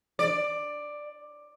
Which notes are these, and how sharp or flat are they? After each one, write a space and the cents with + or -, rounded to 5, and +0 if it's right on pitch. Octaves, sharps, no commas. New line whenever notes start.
D5 +10